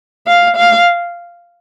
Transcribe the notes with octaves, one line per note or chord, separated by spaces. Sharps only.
F5
F5